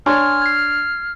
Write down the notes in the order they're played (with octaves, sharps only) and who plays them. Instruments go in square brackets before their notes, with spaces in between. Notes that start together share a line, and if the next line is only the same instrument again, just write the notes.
[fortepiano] D4 C#5 [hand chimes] G#5 C6 G#6 [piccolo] F6
[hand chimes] G#6 C7